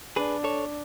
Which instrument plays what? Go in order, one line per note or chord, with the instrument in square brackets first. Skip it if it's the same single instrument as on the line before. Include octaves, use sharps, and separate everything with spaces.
[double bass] D4 [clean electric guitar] G#4 B4
[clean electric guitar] A4 C#5